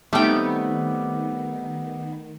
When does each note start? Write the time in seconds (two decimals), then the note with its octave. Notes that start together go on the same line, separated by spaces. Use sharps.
0.13 D#3 G3 A3 B3 C4 D#4 G5